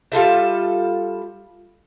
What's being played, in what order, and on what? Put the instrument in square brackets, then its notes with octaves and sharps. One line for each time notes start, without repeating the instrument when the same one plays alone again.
[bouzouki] G3 F4 A4 E5